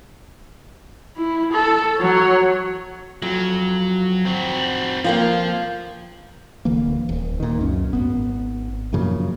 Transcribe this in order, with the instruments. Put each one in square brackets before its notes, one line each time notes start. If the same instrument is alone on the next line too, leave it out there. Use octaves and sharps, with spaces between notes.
[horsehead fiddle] E4
A4
F#3 C#5
[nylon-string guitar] F2 [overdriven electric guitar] F#3
[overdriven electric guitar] C4 F#4
[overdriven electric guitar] F3 [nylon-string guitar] A#3 C4 F4
[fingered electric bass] D1 D3 E3 A#3
D#1
A#2 D#3
C#2 F#2 C#4
G#1 B3
F#2 A#2 C#3 F3